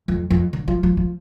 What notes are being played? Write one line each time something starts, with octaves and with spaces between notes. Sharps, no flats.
F2
F2
D3
F3
F3
F3